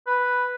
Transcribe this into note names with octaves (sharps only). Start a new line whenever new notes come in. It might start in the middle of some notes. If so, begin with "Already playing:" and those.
B4